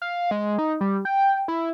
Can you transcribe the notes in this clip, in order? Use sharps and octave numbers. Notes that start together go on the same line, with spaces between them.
F5
G#3
D#4
G3
G5
E4